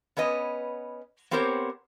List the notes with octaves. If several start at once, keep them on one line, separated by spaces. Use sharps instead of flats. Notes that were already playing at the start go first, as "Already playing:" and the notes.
B3 C#4 B4 D#5
B3 C4 G4 A#4 C5 C#5